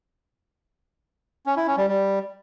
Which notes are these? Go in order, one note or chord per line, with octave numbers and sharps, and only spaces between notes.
C#4
E4
C#4
G3
G3